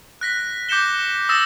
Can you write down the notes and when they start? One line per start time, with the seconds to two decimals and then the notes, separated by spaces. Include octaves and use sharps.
0.21 F#6 A#6 B6
0.69 D6 G6 A#6 C#7 E7 G7
1.29 D#6 E6 A6 A#6 E7